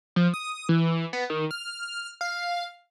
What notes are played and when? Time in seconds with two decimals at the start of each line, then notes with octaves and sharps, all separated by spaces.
0.16 F3
0.34 D#6
0.69 E3
1.13 B3
1.30 D#3
1.51 F6
2.21 F5